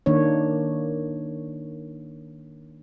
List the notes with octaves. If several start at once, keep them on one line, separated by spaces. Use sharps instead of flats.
D#3 A#3 D4 C#5